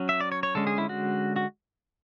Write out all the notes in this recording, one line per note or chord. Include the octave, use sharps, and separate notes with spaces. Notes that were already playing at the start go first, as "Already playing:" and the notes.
Already playing: F#3 C#4
E5
D5
C#5
C#5
D3 G#3 C#4 A4
G#4
E4
F#4
F#4